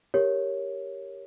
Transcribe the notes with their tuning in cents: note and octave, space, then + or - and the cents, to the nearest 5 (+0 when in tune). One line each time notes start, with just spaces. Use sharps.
G4 +0 A#4 -5 C#5 +0